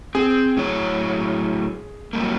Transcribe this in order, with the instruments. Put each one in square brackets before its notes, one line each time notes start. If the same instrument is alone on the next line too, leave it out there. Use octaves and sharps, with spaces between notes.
[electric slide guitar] C4 [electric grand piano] G#4
[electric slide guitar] A2 F#3 C#5
F#3 G3 A#3